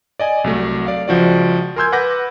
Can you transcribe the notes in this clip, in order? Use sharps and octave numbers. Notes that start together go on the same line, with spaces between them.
D5 D#5 G#5
C2 F#3 A3
D5 F5
C#2 F3 F#4 D5
A#4 G#5 C6 E6 G6 G#6
B4 F#5 B5 D6 G6 A#6